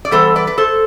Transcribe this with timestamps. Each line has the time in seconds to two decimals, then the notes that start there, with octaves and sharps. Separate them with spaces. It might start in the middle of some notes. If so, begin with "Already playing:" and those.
0.05 D5
0.11 E3 G3 B3 A4 C5
0.36 B4 D5
0.47 B4
0.58 A4 C5